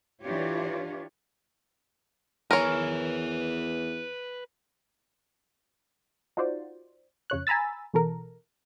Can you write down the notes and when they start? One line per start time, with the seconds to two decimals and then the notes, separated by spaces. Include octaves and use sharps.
0.21 E3 D4 F4 G4 C#5
2.51 E2 A#4 B4 C#5 G#5
6.37 D#4 F4 F#4 C5 D5
7.30 F2 C#3 C#5 F#6
7.47 G#5 A#5 B5 E6 A6
7.94 B2 E3 A4 A#4